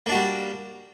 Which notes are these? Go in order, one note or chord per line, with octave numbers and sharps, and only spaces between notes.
G3 A#3 D4 F#4